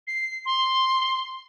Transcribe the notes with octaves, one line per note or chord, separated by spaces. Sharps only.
C7
C6